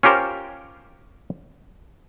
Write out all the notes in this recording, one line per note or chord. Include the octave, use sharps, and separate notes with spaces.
C#4 F4 G4 A#4 C5